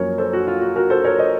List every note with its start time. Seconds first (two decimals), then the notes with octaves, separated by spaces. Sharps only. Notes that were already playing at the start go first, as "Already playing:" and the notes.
Already playing: F#2 F3 A#3 C#4 A#4 C#5
0.18 A4 C5
0.33 F#4
0.47 F4
0.62 F#4
0.76 F#4 A#4
0.90 A4 C5
1.04 A#4 C#5
1.19 C5 D#5